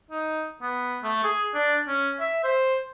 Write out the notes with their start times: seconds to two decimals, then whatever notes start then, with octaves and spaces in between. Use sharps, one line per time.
0.11 D#4
0.62 B3
1.04 A3
1.24 G#4
1.55 D4
1.88 C#4
2.20 E5
2.44 C5